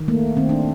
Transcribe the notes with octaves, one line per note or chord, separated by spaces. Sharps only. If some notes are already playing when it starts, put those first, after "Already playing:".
Already playing: D#3
A3 A#3
D#3 C4
D4